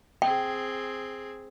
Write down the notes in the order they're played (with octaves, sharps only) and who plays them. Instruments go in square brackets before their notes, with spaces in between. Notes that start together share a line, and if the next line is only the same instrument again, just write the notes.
[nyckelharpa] C4 G#4 [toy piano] G5